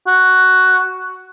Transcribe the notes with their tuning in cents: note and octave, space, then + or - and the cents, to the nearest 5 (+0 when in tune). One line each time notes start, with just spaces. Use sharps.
F#4 +5